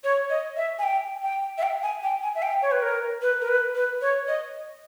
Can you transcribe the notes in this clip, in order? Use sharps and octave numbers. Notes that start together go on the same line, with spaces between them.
C#5
D#5
E5
G#5
G5
G5
E5
G5
G#5
G5
G#5
E5
G5
C#5
B4
A#4
B4
A#4
B4
B4
C#5
D#5